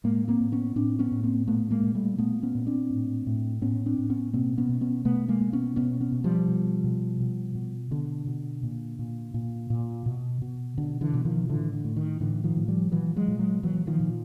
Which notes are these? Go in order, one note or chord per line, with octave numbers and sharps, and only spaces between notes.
A2 G#3 A#3
A#3 C4
A2
B3 C#4
A2 C4 D4
B3 C#4
A2
A#3 C4
A#2 A3 B3
G#3 A#3
A#2
G3 A3
A#2 A3 B3
B3 C#4
A#2
C4 D4
A2
A2
A2 B3 C#4
C4 D4
A2
B3 C#4
B2 A#3 C4
B3 C#4
B2
B3 C#4
B2 A3 B3
G#3 A#3
B2
B3 C#4
B2 B3 C#4
B3 C#4
B2
F3 G3
B2
B2
B2
B2
B2 D3
B2
A#2
A#2
A#2
A#2
B2
B2
B2 D3
D3 E3
B2
D#3 F3
A2 D3 E3
D3
A2
D#3
A2 D3 E3
D#3 F3
A2
F3 G3
A#2 E3 F#3
F#3 G#3
A#2
F#3 G#3
A#2 E3 F#3
D#3 F3
A#2